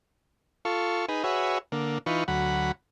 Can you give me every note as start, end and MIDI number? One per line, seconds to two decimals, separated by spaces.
0.65 1.06 65
0.65 1.06 69
0.65 1.06 85
1.09 1.24 63
1.09 1.24 68
1.09 1.24 71
1.24 1.58 66
1.24 1.58 68
1.24 1.58 71
1.24 1.58 73
1.24 1.58 76
1.72 1.98 50
1.72 1.98 58
2.06 2.24 52
2.06 2.24 63
2.06 2.24 65
2.06 2.24 71
2.06 2.24 85
2.28 2.72 38
2.28 2.72 54
2.28 2.72 78
2.28 2.72 83